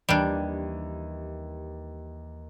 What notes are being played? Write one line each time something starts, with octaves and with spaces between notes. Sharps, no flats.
D#2 E3 G3 D4 G#6